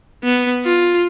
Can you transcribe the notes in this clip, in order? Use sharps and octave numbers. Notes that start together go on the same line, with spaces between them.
B3
F4